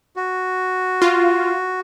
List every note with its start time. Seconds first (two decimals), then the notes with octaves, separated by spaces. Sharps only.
0.16 F#4
1.02 F4